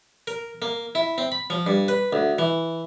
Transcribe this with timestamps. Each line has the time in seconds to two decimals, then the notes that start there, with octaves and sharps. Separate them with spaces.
0.27 A#4
0.62 A#3
0.95 E4
1.18 C4
1.32 B5
1.50 F3
1.67 G2
1.88 B4
2.13 D2
2.38 E3